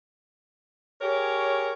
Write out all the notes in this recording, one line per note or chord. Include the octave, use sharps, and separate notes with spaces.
G4 G#4 A#4 C#5